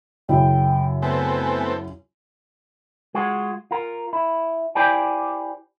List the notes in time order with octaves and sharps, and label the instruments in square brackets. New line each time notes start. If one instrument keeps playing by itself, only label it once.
[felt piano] F#2 C#3 E4 [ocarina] G5
[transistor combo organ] A3 B3 C4 [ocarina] G#5
[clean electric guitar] G#3 F4 F#4
F4 A#4
E4
E4 G4 C5 D5 G5 G#5